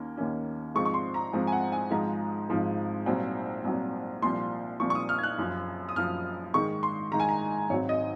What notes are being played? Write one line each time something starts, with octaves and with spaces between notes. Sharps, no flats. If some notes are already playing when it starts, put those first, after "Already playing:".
Already playing: D#2 D#3 A#3 C#4
D#2 D#3 A#3 C#4
G#2 F3 G#3 C4 C#6
C#6
C6
A#5
G#2 F3 G#3 C4
G#5
F#5
G#5
G#1 G#2 F3 G#3 A#5
G#1 G#2 F3 G#3
C2 A#2 F#3 C4
C2 A#2 F#3 C4
C2 A#2 F3 C6
C2 A#2 F3 C#6
C#6
D#6
F6
G#6
F#6
F#1 F#2 F3
D#6
F#1 F#2 F3 F6
G#2 D#3 G#3 C#6
C6
G#2 D#3 G#3 A#5
G#5
A#5
G#1 G#2 F#3 C4 C#5
D#5